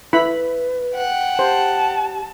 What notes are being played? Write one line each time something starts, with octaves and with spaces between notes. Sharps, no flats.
E4 B4 B5
F#5 G5
G4 C5 A5